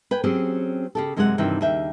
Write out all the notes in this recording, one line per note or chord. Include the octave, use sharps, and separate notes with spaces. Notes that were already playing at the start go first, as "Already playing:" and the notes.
B4 G5 G#5
F#3 C4 C#4 G4 G#4
C#3 G4 A4
F#2 C3 G#3 G#4 A#4 F#5
G2 C3 D#3 E3 F#4 G5
D#2 C#3 E5 G5